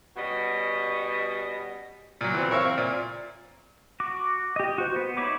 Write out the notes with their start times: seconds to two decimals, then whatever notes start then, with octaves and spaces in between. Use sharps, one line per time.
0.17 B2 G3 C#4 F#4 D#5
2.21 A#2 F#3
2.34 E3 C4
2.51 A#4 C#5 E5 F5
2.65 C4
2.78 A#2
4.00 F#4 D6
4.56 G4 D#5
4.78 F#4 C5
4.96 B3
5.17 D#4 E4 C#5 B5 D6